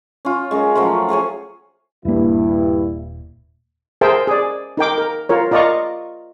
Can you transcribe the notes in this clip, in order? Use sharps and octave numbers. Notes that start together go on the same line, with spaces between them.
C#4 F4
G#3 C#4 A#4
F3 F#3 A3 F4
F4 G#4 C#5 G#5
D#1 G2 A#3 E4
G#4 A#4 C5 E5 G5 A5
G#4 D5
D#4 A#4 G5 D6
A#4
F4 A#4 C#5
F4 A#4 D5 D#5 A#5 C#6